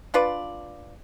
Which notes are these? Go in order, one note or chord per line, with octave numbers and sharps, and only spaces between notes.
D4 F4 B4 D5